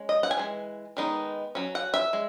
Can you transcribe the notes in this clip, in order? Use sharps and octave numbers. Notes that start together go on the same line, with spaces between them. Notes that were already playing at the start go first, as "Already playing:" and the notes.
Already playing: G#3 C#4
D#5
F#5
G#5
E3 G#3
D#3 G#3 B3 D#4
F#3 C#4
F#5
E5
G#3